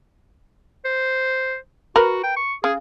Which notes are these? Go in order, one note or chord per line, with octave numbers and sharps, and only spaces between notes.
C5
F#4 A#4 B4
G5
C#6
C#3 G#4